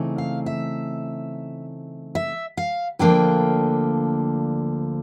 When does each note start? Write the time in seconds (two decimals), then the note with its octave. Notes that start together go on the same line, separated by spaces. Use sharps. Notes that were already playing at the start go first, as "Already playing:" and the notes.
Already playing: C#3 E3 A3 C4 D#4
0.18 F5
0.46 E5
2.15 E5
2.57 F5
2.99 D2 D3 F3 A#3 D4 G5